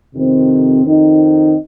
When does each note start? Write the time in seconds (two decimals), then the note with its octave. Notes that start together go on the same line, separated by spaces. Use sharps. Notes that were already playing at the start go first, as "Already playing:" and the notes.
0.13 F2 C3 D#3 C4
0.85 F2 D#3 C4 D#4